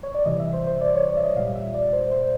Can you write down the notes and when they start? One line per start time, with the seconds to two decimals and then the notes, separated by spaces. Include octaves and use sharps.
0.03 C#5
0.14 D5
0.25 C3 E3 G3 D#5
0.39 E5
0.53 C5
0.67 C5
0.81 D5
0.95 C#5
1.09 D5
1.17 E5
1.23 D#5
1.36 A#2 G3 F5
1.55 E5
1.74 D5
1.93 C5
2.11 C5